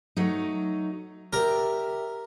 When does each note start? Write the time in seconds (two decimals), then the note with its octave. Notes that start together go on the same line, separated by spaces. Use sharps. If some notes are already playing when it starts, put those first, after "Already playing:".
0.17 F#3 A3 D#4
1.33 G4 A#4 D5 E5